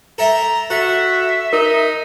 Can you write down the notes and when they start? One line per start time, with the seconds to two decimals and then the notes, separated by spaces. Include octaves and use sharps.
0.18 A4 E5 G5 A#5
0.70 F#4 A4 E5
1.53 D#4 A#4